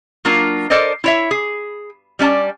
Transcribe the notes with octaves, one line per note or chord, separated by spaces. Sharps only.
F#3 A#3 D4 F4 A#4
A4 A#4 C5 D5 D#5
E4 C#5 E5
G#4
G3 C#4 D5 A5